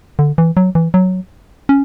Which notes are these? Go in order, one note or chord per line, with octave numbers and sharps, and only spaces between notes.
D3
E3
F#3
E3
F#3
C#4